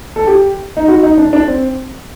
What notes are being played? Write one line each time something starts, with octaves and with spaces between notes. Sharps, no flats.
A4
G4
D#4
F#4
D#4
D4
D4
C4